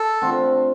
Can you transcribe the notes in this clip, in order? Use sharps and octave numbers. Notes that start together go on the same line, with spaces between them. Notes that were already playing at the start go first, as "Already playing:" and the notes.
Already playing: A4
D3 A3 C4 F4